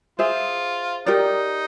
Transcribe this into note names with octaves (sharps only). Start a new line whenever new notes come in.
F4 G#4 C5 E5
D#4 G4 A#4 D5